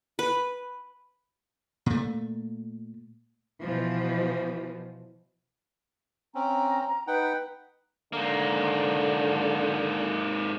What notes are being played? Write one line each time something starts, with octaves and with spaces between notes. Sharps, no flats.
B4
A#2 A3
B2 E3 F3
C4 C#4 A#5
D#4 B4 F#5 G5
G#2 D3 A#3